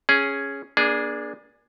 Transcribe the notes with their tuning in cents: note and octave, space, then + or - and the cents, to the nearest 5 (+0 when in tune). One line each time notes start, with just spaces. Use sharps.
C#4 +0 G#4 +0
A#3 +45 D4 +0 G#4 +0